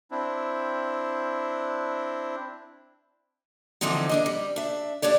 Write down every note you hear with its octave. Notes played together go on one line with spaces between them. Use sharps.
C4 D4 E4
D3 E3 F3 G#3 C4 D#4
C3 D4 D#5
G3
D4 E5
A3 D4 G4 C#5 D5